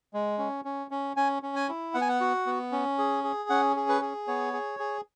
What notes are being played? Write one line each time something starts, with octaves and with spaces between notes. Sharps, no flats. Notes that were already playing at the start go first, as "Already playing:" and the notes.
G#3
C#4
C#4
C#4
C#4 G#5
C#4
G#5
E4
B3 F#5
G#5
F#5
F#4
B3
C#4
G#4
G#4
C#4 F#5
G#4
B4
G#4
B3 C#5
G#4
G#4